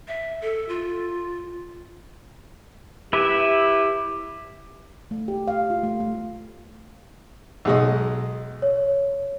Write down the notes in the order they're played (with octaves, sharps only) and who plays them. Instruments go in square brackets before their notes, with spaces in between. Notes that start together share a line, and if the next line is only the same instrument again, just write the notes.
[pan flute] E5
A4
F4
[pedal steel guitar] E4 B4 E5 [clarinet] G4
[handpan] A3
G4
F5
F4
A3
A3
[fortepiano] B1 G#3 D#5
[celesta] C#5